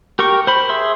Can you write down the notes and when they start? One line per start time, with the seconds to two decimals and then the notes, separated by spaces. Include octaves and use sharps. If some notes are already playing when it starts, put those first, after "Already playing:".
0.19 G4 A#4 G5 C#6
0.47 C5 B5
0.69 G#4 E5 C6